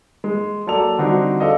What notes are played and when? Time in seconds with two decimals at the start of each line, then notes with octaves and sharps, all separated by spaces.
0.24 G#3
0.67 F#3 A#3 A4 D5 A5 F7
0.98 D3 G3 C4 D4 D#4 F#4
1.40 G#4 A4 D5 D#5 F5